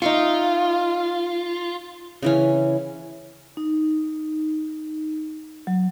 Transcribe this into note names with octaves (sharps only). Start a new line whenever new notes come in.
D#4 F4 E5 C#6
C#3 E3 C#4
D#4
F#3